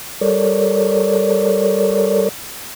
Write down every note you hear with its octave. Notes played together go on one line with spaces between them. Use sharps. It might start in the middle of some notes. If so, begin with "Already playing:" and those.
G3 A4 A#4 C#5 D5